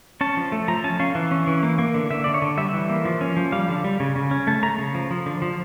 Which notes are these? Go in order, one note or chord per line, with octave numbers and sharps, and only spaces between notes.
C#4 A5
F3
A3
F3 A#5
C#4 A5
C#4 F5
E3
C#4
E3
A#3
A#3
D3
D3 E5
D3 D5
C#5
D3
G3 E5
E3
A#3
F3
C#4
F3
G3 F5
D3
G3
C#3
C#3
C#4
A3 A5
A3 A#5
C#3
F3
F3
D3
F3